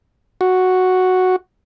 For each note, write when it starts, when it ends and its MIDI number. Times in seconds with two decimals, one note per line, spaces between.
0.41 1.36 66